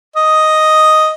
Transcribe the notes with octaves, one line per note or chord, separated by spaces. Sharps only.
D#5